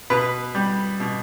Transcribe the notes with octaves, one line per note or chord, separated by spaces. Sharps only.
B2 B4
G3
B2